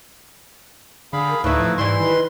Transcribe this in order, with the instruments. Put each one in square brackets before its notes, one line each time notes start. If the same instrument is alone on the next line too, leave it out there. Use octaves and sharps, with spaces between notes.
[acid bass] D3 [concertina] G#4 F5 B5
[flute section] A#4
[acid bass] D2 [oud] A2 E5 [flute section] D#4 F5 C#6 [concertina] E4 B4
[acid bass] F3
[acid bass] G#2 [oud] E3 G3 E4 [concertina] C6
[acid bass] D#3 [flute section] B4 D#5 B5